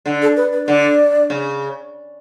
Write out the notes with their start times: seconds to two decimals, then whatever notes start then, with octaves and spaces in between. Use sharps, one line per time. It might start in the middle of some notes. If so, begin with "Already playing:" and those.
0.06 D3
0.22 A4
0.37 B4
0.52 B4
0.67 D3 D5
1.30 C#3